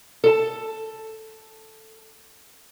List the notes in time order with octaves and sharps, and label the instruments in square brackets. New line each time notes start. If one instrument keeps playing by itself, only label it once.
[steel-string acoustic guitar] A4 A5